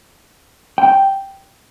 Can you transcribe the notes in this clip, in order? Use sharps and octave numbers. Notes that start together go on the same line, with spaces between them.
G5